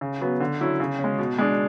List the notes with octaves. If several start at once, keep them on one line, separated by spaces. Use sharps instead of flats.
C#3
F#3 B3
D3
F#3 C#4 E4
C#3
C#4
G#3
B2
G#3 D4